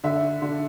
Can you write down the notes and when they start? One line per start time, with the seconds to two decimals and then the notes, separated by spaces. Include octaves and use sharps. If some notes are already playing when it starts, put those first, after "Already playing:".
0.04 D3 E5
0.42 D3